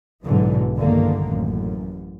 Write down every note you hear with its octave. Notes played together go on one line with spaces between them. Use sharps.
B1 G#2 B2 D3 E3 F#3
E2 G2 D3 D#3 A#3
A1 F#2